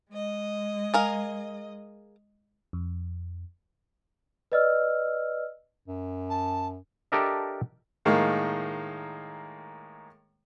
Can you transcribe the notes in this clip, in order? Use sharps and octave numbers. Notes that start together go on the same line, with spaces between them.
G#3 D#5
G#4 A#4 F5
F2
B4 D5 D#5 E6 F6
F#2
A5
D4 G4 A4 A#4 D#5 E5
A2 D#3 G#3 A#3